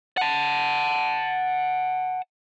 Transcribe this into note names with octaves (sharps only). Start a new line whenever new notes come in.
F#5 A5